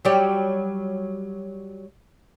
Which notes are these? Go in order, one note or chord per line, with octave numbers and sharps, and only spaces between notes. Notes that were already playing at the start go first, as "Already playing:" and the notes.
F#3 G3 G4